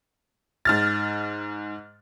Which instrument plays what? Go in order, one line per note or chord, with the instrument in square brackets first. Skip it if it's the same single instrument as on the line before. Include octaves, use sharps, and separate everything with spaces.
[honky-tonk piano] G#2 F6 A6